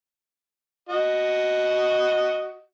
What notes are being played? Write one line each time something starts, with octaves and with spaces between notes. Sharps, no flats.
F#4 D#5